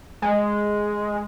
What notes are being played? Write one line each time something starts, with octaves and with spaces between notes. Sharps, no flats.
G#3